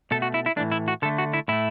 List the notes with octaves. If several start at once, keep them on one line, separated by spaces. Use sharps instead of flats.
B2 A3 A4
F#4
E4
E4
A2 E3 A3 D4
E4
F#4
D3 A3 A4
F#4
E4
A2 A3 E4